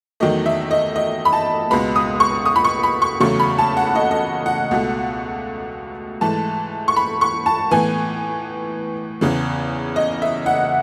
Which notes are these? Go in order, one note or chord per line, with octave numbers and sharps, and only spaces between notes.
E2 D#3 F#3 A3 D#5
E5
D#5
D#5
B5
A5
C#2 B2 G#3 B3 B5
D#6
C#6
D#6
B5
C#6
B5
C#6
E2 C#3 F#3 A3 C#6
B5
A5
F#5
D#5
D#5
F#5
C#2 B2 A3
G#2 E3 A3 A5
C#6
B5
C#6
A5
A2 E3 B3 G#5
E2 C#3 E3
D#5
E5
F#5